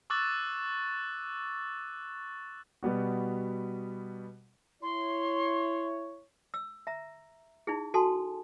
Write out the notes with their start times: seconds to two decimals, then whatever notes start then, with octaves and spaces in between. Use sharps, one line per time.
0.10 C#6 D6 E6 F#6 A6
2.83 B2 G3 B3 F#4
4.82 E4 C#5 C6
6.54 E6
6.87 E5 A#5
7.67 D#4 E4 G#4
7.94 F#4 A4 G#5 A5 C6